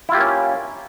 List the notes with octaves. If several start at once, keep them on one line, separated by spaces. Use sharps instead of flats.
A#3 C#4 E4 F4 G4